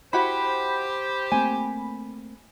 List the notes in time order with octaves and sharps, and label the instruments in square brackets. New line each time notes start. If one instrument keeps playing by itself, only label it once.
[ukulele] E4 F#4 F#5 [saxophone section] G4 C5 [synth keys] B5
[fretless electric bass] A3 A#3 C4 [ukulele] G#5